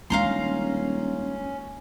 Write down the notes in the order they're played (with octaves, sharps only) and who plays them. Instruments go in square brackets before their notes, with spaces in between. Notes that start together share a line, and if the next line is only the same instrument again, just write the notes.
[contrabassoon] D#1 [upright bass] G#3 D4 [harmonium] C#4 [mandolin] F5 A#5 C6